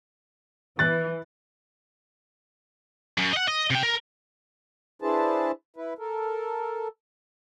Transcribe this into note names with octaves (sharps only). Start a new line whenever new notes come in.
E3 F#6 A6
F#2
D#5 F#5
D#5
C3 G5
A#4
D4 E4 G#4 B4 C5 A5
E4 B4
A4 A#4